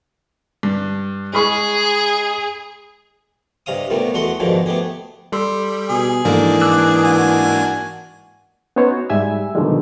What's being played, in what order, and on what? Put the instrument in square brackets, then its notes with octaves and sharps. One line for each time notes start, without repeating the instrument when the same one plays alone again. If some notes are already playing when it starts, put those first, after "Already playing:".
[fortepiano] G2
[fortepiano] G#3 B5 C#6 [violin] G#4
[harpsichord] G2 C3 D#5 F5 D#6
C2 A#2 G3 A3 B3
E2 A3 F#4 D#5 F#5 C6
F2 G#2 B2 D3 D#3 F3
A3 B3 G4 G#4
[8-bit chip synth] G3 [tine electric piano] A4 C6 E6
[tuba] B2 [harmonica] G#4
[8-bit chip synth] G#2 A#3 D4 [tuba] E3 [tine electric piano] F3 A4
[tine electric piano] D6 E6 F#6
[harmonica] F#4 G#5
[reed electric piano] B3 C#4 D#4 C5 C#5
F#4
G#2 G3 E5 G#5 E6
B2 D3 D#3 F3 G3 G#3